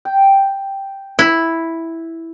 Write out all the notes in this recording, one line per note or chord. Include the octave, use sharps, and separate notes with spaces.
G5
E4